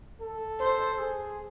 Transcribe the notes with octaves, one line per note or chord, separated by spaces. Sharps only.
A4
C5
G#4